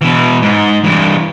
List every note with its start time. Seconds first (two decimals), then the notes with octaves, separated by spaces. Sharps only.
0.02 B2 E3
0.42 G#2
0.84 G2 E3